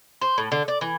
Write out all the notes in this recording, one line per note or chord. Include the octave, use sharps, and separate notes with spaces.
C5
A2
D3
D5
E3